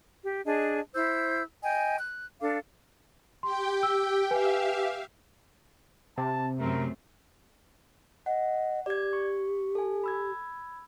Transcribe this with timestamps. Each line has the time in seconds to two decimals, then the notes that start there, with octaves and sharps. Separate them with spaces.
0.23 G4
0.46 D4 G#4 D#5 A5
0.94 E4 C5 E6 G6
1.63 D#5 G5 G#5
1.99 F#6
2.41 D4 A4 F5 D6
3.43 G4 G5 C6
3.83 E6
4.31 G4 B4 E5 F5 G#5
6.18 C3 A5
6.60 F#2 A3 C4 A#4
8.26 D#5 F#5
8.86 G4 D5 G#6
9.13 C#6
9.75 A4 G#5
10.04 B5 E6 G#6